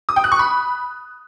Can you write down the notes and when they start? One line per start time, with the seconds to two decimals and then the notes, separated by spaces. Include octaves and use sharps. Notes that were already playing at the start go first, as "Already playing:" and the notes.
0.09 D#6
0.16 G5
0.24 F#6
0.32 C#6
0.39 B5